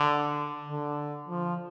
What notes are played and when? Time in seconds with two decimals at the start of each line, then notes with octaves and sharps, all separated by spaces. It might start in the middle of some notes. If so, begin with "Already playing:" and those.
Already playing: D3
0.69 D3
1.28 F3